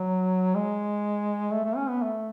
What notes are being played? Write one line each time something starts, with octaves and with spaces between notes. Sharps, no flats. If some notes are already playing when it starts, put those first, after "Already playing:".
Already playing: F#3
G#3
A3
A3
C#4
B3
A3